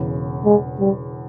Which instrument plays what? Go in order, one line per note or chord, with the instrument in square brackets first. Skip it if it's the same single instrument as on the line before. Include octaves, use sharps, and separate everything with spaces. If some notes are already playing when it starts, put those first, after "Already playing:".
Already playing: [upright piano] E1 E2 C#3
[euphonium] G#3
G3